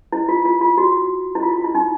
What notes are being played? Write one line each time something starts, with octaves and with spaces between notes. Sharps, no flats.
E4
F4
F4
F4
F#4
E4
F4
F4
E4
D#4